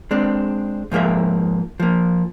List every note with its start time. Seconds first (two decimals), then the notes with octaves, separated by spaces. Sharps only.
0.11 G#3 C4 D4
0.92 G#2 F3 A#3 G#4 E5
1.80 F3 A#3